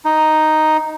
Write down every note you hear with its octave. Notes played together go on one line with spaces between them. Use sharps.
D#4